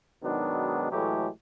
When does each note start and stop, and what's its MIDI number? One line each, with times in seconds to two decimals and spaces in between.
0.23 0.86 44
0.23 0.86 47
0.23 0.86 51
0.23 0.86 54
0.23 0.86 59
0.23 0.86 62
0.91 1.27 45
0.91 1.27 52
0.91 1.27 54
0.91 1.27 56
0.91 1.27 57
0.91 1.27 67